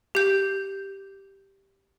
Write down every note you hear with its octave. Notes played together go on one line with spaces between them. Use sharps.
G4 G6